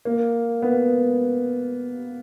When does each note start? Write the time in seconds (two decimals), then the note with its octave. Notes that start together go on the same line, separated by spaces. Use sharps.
0.05 A#3
0.62 B3